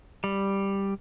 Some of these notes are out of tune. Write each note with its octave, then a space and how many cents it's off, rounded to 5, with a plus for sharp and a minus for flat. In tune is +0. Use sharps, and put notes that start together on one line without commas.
G3 +5